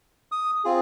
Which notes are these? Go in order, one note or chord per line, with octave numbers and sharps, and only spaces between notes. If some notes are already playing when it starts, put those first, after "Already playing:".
D#6
C4 F4 G#4